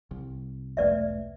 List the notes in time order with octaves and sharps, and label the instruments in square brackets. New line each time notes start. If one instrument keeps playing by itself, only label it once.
[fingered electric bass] C2
[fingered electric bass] E1 B1 A3 [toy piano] B4 D5 E5